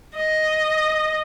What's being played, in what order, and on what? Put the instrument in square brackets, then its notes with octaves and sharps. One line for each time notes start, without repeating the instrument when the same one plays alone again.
[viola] D#5